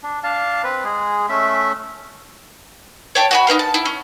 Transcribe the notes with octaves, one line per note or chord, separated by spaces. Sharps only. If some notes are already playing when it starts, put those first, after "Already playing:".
D4
D4 F5 A5
C4 B4
G#3 G#4
A3 C#4 E5
C#5 G5 A5
F#4 G#5 B5
D#4 E4 B4 F5
A5
E4
C#4